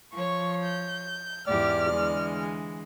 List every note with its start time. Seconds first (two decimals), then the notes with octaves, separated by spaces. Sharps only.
0.14 F3 C#5 C#6
0.64 G6
1.48 E2 G#2 E4 G4 D5 F6
1.91 D3 E3 G#3